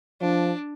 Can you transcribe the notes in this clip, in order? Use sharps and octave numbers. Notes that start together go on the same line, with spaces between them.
F3 D4